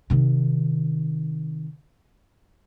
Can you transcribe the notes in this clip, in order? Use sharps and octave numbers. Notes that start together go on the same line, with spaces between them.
C3 D#3